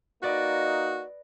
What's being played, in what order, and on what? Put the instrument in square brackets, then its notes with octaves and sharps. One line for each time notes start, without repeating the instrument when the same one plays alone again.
[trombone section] A#3 D#4 [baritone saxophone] F#4 [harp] B4 D5 D#5